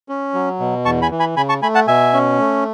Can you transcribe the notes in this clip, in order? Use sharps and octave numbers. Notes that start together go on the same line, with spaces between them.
C#4
F#3
B2
E2 A5 C#6
G#5 B5
E3
G#5 B5
C#3 G#5 B5
A5 C#6
A3 G#5 B5
F#5 A5
B2 E5 G#5
C#4
A3